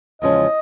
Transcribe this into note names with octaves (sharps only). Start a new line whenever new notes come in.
E2 C#3 F3 G#3 C#4 D#5